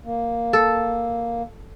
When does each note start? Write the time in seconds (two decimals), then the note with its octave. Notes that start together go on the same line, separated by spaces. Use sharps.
0.05 A#3
0.53 A4